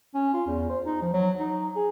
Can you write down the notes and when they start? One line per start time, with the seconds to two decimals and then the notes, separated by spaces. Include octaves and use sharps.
0.14 C#4
0.33 F4
0.47 E2
0.70 C5
0.85 D#4
1.02 F3
1.13 F#3
1.40 D#4
1.76 G#4